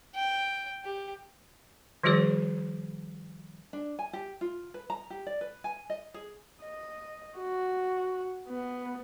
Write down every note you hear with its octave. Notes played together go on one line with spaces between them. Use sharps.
G5
G4
D#3 F3 G3 F#4 G#4 C#5
D4
G#5
G4
F4
B4
A#5
G4
D5
B4
G#5
D#5
G#4
D#5
F#4
B3